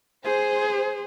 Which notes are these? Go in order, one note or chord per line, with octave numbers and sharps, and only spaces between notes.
G#4 C5